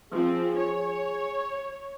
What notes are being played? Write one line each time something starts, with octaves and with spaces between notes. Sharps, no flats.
F3 C4 G#4
C#5